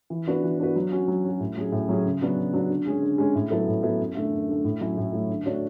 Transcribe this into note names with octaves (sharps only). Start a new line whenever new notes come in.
E3
B3 D4 F#4 B4
E3
B3 D4 F#4 B4
F#3
C#4 F#4
F#3
C#4 F#4
A2
F#3 C#4 G#4
A2
F#3 C#4 G#4
C#3
F#3 B3 D4 F#4
C#3
F#3 B3 D4 F#4
D3
G#3 C#4 G#4
D3
G#3 C#4 G#4
A2
F#3 B3 E4 A4
A2
F#3 B3 E4 A4
F#2
D3 A3
F#2
D3 A3
A2
F#3 A3 C#4 E4
A2
F#3 A3 C#4 E4
D3
A3 D4 F#4 C#5